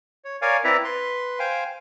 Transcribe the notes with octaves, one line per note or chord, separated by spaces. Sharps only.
C#5
A#4 C#5 D5 F5 G#5
C4 E4 B4 D5 E5 A#5
B4 C6
C5 F5 G5 G#5